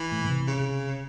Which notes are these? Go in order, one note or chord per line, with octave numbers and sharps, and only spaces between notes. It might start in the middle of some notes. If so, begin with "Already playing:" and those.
Already playing: E3
A2
A2
C3
C#3